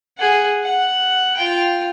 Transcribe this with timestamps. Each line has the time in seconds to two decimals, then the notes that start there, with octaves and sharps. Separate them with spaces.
0.18 G#4 F#5
0.63 F#5
1.37 F4 G5